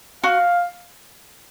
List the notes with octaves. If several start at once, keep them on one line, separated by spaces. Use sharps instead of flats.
F#4 F5